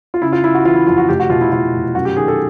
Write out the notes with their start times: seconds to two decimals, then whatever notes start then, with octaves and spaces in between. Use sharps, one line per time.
0.14 F4
0.22 C#3 E4
0.33 F4
0.44 C#3 E4
0.54 F#4
0.65 E3 F4
0.76 E4
0.87 F2 F4
0.98 F#4
1.09 F1 G4
1.20 F#4
1.30 B2 F4
1.41 E4
1.52 B2 F4
1.73 F1
1.95 F#2 F#4
2.05 G4
2.16 D#3 G#4
2.28 A4